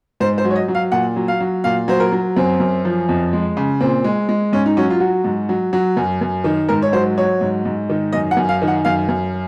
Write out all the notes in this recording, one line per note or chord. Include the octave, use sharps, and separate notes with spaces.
G#2 C5
C5
F#3
C#5
D#5
F#3
F5
A#2 F#5
F#3
F5
F#3
A#2 F5
F#3 C5
A#4
F#3
F#2 C4
F#2
F3
F2
G#3
C#3
A#2 C4
G#3
G#3
G#2 C#4
D#4
F#3 C#4
F4
F#3 F#4
G#2
F#3
F#3
F#2
F#2
D#3
G#2 A#4
C#5
F#3 C5
F#3 C#5
G#2
G#2
D#3
F#2 D#5
F#5
F#2
F5
D#3
F#5
F#2 F5
F#2